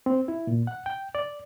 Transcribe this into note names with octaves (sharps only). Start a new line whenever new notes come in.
C4
E4
A#2
F#5
G5
D5